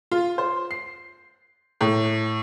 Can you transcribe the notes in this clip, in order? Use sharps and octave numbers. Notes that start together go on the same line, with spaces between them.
F4
C5
C7
A2